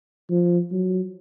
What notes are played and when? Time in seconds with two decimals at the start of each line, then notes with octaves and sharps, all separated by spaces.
0.30 F3
0.72 F#3